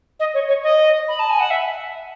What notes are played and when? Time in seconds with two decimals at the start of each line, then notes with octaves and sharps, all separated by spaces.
0.20 D#5
0.34 C#5
0.48 C#5
0.63 D#5
1.08 B5
1.19 A5
1.30 G#5
1.40 F#5
1.50 E5